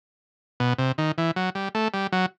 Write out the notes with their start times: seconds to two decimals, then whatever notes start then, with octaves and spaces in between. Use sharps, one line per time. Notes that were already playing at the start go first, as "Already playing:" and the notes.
0.60 B2
0.78 C3
0.98 D#3
1.18 E3
1.36 F#3
1.55 G3
1.75 A3
1.94 G3
2.12 F#3